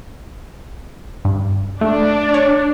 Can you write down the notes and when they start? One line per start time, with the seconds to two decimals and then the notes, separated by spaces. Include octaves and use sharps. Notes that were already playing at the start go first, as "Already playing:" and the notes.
1.25 G2
1.81 A3 D4
2.34 C#5